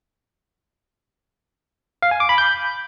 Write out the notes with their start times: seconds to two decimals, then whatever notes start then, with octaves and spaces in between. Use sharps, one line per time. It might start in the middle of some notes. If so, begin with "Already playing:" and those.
2.02 F5
2.11 G#5
2.20 D6
2.29 B5
2.38 G6